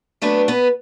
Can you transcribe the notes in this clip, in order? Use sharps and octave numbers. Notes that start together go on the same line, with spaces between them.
F#3 A3 B3 D4 B4
B3 B4